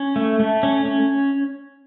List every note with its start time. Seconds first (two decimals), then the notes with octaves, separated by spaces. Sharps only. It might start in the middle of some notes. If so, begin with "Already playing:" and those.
Already playing: C#4
0.16 A3
0.40 A3
0.63 C#4
0.85 C#4